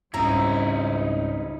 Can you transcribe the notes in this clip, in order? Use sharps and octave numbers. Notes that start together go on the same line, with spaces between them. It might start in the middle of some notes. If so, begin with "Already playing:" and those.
C#2 G#2 G3 C4 C#4 D#4 E4 A#5